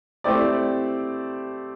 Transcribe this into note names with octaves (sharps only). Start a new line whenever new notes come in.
A3 C4 E4 G4 D5